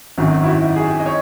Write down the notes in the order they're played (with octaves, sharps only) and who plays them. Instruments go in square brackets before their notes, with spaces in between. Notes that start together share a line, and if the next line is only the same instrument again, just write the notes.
[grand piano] G#1 F#2 D#3 F#3 F#4
E4
F#4
G#4
D#5
C#5